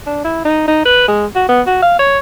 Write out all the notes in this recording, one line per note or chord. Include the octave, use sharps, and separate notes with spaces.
D4
E4
D#4
D#4
B4
G#3
F#4
B3
F#4
F5
C#5